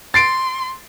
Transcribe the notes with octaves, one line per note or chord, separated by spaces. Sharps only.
C6 A6 C7 D7